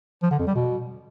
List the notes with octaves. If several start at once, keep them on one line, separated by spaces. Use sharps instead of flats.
F3
D3
F2
G3
B2